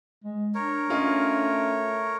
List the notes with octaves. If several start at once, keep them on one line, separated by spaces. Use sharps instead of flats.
G#3
D4 A#4 C#5
A3 C#4 F4 D#5